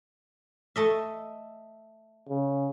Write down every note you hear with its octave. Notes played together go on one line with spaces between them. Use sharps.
A3 D#5 E5
C#3